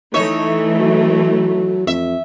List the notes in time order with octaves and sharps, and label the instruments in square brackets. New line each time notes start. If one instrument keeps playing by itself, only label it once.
[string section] E3 A3 [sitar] D#4 C#5 E5
[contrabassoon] F#3
[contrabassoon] F2 [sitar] E5